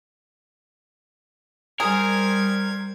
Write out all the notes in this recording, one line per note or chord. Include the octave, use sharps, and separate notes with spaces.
G3 G#4 A#4 C5 G#6